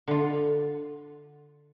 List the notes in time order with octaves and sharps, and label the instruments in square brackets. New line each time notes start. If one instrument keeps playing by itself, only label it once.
[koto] D3 F4